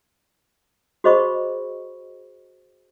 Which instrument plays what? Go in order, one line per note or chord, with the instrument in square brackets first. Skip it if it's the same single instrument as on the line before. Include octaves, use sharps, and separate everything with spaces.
[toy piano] F#4 G#4 C5 D#5 B5 C#6